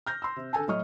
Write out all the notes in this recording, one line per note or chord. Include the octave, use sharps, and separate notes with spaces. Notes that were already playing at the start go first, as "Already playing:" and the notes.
F6 G6 A#6
C6 E6
C3
D3 A4 G#5 A5
A2 F#3 D#5 C#6 F6